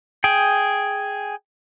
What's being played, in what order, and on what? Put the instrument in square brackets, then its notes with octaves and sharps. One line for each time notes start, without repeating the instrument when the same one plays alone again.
[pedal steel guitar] G#4 G5